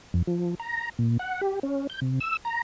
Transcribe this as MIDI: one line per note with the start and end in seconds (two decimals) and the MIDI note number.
0.14 0.22 41
0.27 0.55 53
0.60 0.89 82
0.99 1.18 46
1.19 1.41 78
1.41 1.59 67
1.63 1.87 61
1.90 2.00 91
2.01 2.19 48
2.20 2.37 88
2.45 2.62 82